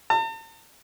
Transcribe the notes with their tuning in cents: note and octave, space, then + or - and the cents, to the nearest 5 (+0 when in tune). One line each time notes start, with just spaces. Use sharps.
A5 +45